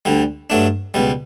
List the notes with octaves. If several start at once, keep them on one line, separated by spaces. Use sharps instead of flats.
D2 D3 G3
G2 F#3 A3 D4
C#2 B2 G3